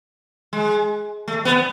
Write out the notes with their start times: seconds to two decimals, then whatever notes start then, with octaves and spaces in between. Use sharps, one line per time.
0.53 G#3
1.28 A3
1.45 B3